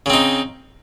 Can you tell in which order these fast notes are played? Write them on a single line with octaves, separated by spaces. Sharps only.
C#3 C4 D#4